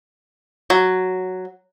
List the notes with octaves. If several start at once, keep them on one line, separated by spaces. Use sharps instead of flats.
F#3